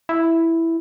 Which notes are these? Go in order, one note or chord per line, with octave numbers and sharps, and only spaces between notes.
E4